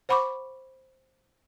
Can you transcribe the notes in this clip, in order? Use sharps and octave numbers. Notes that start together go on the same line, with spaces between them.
C5 F#5 B5 C#6 D6